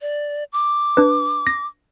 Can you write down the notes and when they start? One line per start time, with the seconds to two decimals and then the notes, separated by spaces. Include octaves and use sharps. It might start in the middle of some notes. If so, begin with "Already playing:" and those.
0.02 D5
0.53 D6
0.97 D4 B4
1.47 A#6